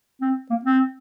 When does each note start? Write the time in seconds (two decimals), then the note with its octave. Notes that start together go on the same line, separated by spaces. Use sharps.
0.21 C4
0.50 A#3
0.65 C4